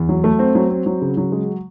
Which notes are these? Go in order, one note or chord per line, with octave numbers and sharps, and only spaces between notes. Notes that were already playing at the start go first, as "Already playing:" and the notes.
Already playing: E2
F#3
A3
C4
F#3
C4
F#3
C#3
F#3
G#3